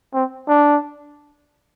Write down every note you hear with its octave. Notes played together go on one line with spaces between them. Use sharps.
C4
D4